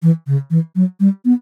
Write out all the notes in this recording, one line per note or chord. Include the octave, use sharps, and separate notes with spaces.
E3
C#3
E3
F#3
G3
B3